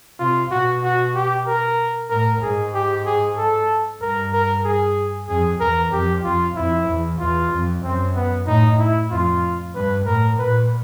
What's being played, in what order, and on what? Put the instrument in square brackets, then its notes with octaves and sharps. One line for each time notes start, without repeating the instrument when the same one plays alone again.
[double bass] C3 [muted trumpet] F4
[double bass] B2 [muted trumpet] F#4
[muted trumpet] F#4
G4
A#4
[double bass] A2 [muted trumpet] A#4
[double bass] G#2 [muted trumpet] G#4
[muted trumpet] G4
G#4
A4
[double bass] G2 [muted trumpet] A#4
[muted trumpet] A#4
G#4
[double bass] F2 [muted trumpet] G#4
[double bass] E2 [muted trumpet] A#4
[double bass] F2 [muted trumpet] G4
[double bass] F2 [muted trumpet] F4
[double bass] F2 [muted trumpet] E4
[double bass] E2
[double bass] E2 [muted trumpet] F4
[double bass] F2
[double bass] F#2 [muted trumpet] C4
[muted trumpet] B3
[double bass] A2 [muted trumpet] D#4
[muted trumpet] E4
[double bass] F2 [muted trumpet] F4
[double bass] G2 [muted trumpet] B4
[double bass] A2 [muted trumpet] A#4
[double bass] A#2 [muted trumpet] B4